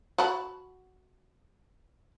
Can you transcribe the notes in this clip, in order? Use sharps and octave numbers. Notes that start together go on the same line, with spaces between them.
F#4 A5 B5